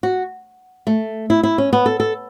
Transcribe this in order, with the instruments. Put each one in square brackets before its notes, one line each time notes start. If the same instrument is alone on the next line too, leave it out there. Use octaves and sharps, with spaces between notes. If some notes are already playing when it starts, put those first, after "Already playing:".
[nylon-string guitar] F#4
A3
E4
E4
C#4
B3
A4
A4